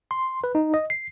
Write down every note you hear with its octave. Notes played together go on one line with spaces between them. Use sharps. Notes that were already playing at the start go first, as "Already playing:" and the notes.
C6
B4
D#4
D#5
C7